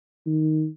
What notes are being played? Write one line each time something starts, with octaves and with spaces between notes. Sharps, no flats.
D#3